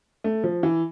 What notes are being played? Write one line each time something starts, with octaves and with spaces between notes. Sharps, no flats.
A3
F3
E3